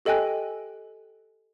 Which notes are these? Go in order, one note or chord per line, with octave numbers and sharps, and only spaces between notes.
G4 A4 D#5 G5 G#5 F#6